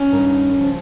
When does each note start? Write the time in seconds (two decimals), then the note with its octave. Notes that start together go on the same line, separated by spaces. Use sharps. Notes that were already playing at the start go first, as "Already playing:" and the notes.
Already playing: C#4
0.12 G2 D#3
0.57 C#3 F3